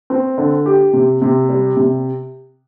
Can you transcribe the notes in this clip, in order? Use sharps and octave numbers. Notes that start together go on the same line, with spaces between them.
C4
D3
G4
C3
C3
G3
C3